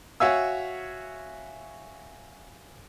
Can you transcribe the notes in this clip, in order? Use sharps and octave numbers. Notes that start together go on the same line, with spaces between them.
F#4 C#5 E5 F5 G#5 E6